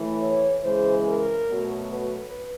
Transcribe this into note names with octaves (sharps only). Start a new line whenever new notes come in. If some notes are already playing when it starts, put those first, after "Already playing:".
Already playing: A2 E3 A3
C#5
C#3 E3 G#3 C5
A#4
B2 F#3 A3
B4